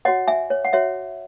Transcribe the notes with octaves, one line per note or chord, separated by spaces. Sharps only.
F#4 C#5 D#5 F#5
E5 G#5
C#5
F#5
F#4 C#5 E5